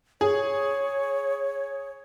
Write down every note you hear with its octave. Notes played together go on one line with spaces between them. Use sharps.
G#4 C#5